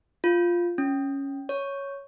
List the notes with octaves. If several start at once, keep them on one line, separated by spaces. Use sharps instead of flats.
F4
C#4
C#5